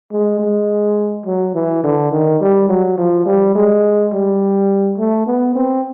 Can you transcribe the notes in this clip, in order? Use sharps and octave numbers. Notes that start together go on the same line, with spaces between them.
G#3
G#3
F#3
E3
D3
D#3
G3
F#3
F3
G3
G#3
G3
A3
B3
C4